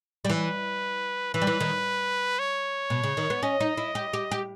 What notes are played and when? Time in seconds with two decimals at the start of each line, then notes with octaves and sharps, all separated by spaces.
0.25 G3
0.30 E3 B4
1.34 E3 B4
1.42 G3
1.47 E3
1.60 D#3
2.39 C#5
2.90 B2
3.04 C#3
3.17 D#3
3.30 B3
3.43 C#4 D#5
3.60 D#4
3.77 E4
3.95 G4
4.13 G4
4.31 G4